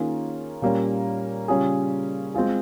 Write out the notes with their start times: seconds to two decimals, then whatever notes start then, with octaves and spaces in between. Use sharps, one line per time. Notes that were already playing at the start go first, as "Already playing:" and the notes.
Already playing: D#3 A#3 C#4 F4 G#4
0.62 A#2 G3 A#3 C#4
1.48 C#3 G3 C#4 F4 G#4
2.34 G#3 C4 F4 G#4